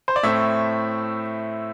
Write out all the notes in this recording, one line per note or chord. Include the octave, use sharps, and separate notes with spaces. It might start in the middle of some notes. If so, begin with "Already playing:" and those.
C5
D5
A2 A3 C4 E4 E5